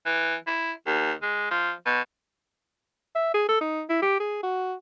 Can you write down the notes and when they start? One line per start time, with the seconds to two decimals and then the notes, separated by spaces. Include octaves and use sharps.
0.06 E3
0.47 E4
0.87 D#2
1.22 G#3
1.51 F3
1.86 B2
3.16 E5
3.34 G#4
3.49 A4
3.61 D#4
3.90 E4
4.02 G4
4.20 G#4
4.43 F#4